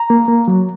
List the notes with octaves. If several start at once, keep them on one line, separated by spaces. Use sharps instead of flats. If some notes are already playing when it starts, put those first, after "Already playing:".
Already playing: A#5
A#3
A#3
F#3